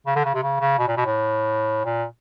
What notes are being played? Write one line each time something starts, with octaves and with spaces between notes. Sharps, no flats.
C#3
D3
C#3
C3
C#3
C#3
B2
A#2
B2
A2
A#2